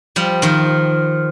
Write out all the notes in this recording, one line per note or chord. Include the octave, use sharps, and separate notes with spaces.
F3 G3
D#3 F3